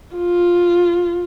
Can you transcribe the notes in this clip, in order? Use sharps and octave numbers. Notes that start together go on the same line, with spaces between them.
F4